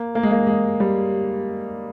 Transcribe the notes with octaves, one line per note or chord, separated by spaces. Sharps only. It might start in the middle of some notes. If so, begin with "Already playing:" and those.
Already playing: A#3
A#3
G#3
A#3
G#3
G3